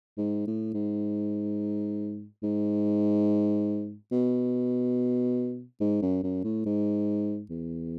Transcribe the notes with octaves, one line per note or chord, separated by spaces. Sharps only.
G#2
A2
G#2
G#2
B2
G#2
F#2
F#2
A2
G#2
E2